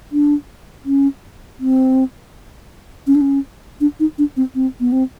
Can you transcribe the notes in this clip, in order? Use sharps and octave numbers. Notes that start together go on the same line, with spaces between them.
D4
C#4
C4
C#4
D4
C#4
D4
D#4
D4
C4
C4
B3
C4